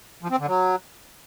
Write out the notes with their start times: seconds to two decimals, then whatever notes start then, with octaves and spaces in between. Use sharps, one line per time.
0.22 F3
0.31 C4
0.39 D3
0.47 F#3